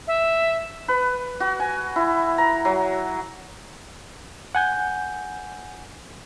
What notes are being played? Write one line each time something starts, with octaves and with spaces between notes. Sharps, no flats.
E5
B4
F#4
G#5
E4
A#5
F#3
F#5 G#5 G6